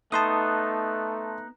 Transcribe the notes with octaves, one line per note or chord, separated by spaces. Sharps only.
A3 B3 D#4 A5 C6 D#6